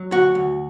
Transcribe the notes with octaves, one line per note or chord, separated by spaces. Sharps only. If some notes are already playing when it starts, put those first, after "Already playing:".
Already playing: F#3
D2 F#4
D2